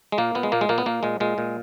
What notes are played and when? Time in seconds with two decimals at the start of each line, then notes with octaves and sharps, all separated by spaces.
0.12 G#3
0.18 A#2 A#3
0.35 A#2 B3
0.43 G#3
0.52 A#2 A#3
0.61 G#3
0.69 A#2 A#3
0.78 B3
0.86 A#2 A#3
1.03 A#2 G#3
1.20 A#2 G#3
1.38 A#2